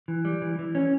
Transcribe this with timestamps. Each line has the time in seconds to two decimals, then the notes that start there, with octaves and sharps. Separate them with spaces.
0.08 E3
0.25 G3
0.42 E3
0.59 E3
0.75 C#4